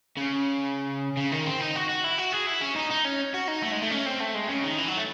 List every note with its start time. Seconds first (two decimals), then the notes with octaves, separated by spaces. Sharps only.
0.17 C#3
1.17 C#3
1.32 D#3
1.46 C4
1.61 D#4
1.76 F#4
1.89 F#4
2.04 E4
2.18 F#4
2.32 G#4
2.47 E4
2.62 C#4
2.76 D#4
2.91 D#4
3.05 C#4
3.34 F#4
3.48 D#4
3.63 A3
3.72 G#3
3.82 A3
3.91 C#4
4.06 C4
4.20 A3
4.35 G#3
4.49 C#3
4.64 D#3
4.78 E3
4.87 F#3
4.97 A3